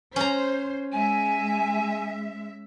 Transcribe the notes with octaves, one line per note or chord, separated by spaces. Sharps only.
C#4 C5 A#5
G#3 E5 G#5